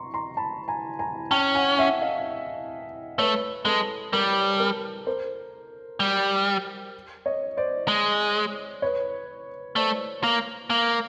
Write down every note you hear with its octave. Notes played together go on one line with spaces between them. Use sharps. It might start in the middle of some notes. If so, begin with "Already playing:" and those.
Already playing: A#5 C6 C#6
A#5 C6
A5 B5
G#5 A#5
G#5 A#5
C#4 G5 A5
F#5 G#5
E5 F#5
D#5 F5
A3 B4 C#5
G#3 A4 B4
G3 A#4
A#4
A#4 C5
G3
C#5 D#5
C5 D5
G#3
B4 C#5
A3 C5 D5
A#3
A#3